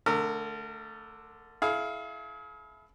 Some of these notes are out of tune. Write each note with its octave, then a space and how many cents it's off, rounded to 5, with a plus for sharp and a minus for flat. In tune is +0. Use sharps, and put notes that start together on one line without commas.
D3 +0 A3 +0 A#4 -30
E4 +0 G#4 +45 F5 +0